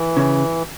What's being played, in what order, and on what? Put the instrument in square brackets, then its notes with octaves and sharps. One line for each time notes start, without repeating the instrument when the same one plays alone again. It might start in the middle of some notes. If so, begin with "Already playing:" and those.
Already playing: [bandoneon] E3
[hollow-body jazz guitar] C#3